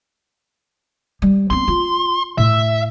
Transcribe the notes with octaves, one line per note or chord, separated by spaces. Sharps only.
G3
B3 C4 C6
F4
A2 E5